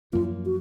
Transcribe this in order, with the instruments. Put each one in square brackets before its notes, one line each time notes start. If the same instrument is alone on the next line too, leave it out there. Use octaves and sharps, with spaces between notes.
[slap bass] F#2 F3 A#3 [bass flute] F4
[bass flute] F#4